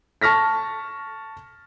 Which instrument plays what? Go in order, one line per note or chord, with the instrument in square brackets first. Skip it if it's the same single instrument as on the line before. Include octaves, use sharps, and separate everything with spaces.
[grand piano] A5 C#6 F6 A#6 B6